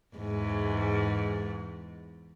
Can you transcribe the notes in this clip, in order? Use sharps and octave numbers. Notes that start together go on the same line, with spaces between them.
E2 G#2